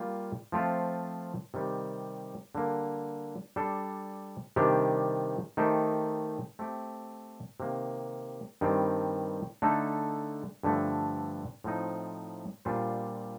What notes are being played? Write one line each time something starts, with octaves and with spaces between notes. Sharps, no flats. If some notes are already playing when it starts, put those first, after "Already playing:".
Already playing: G3 A#3 F4
F3 A3 C4 F4 C5
C3 D#3 G3
D3 G3 A#3
G3 D4 A4
C3 D#3 G3 D4 G4
D#3 A3 D#4 G4 C5
A3 C4 G4
C3 D#3 A#3
G2 D#3 G3 C4
D3 A3 D#4 A4
G2 D3 F3 A3
A2 F3 C4 D#4
A#2 G3 D4 F4 C5